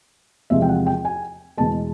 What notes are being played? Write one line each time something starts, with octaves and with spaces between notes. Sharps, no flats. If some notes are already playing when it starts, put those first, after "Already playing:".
E2 C3 F3 G#3 E5
G5
F#5
G5
G#5
E2 B2 G#3 A5